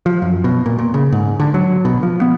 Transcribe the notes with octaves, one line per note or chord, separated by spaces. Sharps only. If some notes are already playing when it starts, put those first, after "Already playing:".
F3
F#2
B2
A#2
A#2
C#3
G#2
D3
F#3
B2
F3
B3